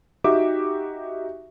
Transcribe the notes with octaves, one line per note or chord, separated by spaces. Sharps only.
D#4 F#4 G4 E5 D6